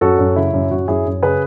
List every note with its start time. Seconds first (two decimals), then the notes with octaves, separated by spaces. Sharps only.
0.01 F#2 F#4 A4
0.19 F#2
0.36 C#3 E4
0.53 F#2
0.71 F#2 F#4
0.88 F#2 E4 G#4
1.06 F#2
1.23 C#3 G#4 B4